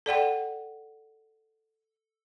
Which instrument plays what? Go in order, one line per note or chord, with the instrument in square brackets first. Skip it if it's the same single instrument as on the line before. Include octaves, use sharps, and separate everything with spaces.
[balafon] A4 D5 F#5 G5